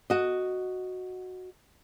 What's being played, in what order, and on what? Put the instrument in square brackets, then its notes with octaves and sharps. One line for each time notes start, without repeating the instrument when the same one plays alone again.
[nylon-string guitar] F#4 D#5